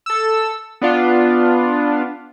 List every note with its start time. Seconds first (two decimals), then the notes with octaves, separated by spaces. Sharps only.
0.06 A4 E6
0.81 B3 D4 F4